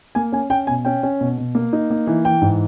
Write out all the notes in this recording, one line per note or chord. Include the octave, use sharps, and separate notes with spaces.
A#3 G#5
C#4 G#5
C#4 G5
B2 G#5
C#4 G5
C#4
B2
B2
A#3
D#4
A#3
E3
E3 G5
G#2